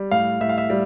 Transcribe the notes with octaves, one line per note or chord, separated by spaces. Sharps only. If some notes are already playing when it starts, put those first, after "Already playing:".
Already playing: G3
A2 F5
A2 E5
F5
E5
G3